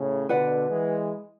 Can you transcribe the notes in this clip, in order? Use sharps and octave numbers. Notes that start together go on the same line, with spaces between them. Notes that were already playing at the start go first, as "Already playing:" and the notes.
Already playing: A2 C#3
B2 D3 B4 D5 F#5
E3 G#3